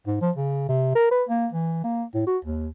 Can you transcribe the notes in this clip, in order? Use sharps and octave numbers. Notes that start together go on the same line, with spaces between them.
G#2
F3
C#3
C3
A#4
B4
A#3
E3
A#3
A2
F#4
D#2